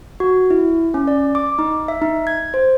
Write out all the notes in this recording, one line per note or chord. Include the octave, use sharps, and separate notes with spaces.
F#4
E4
C#4
D5
D6
D#4
E5
D#4
G#6
C5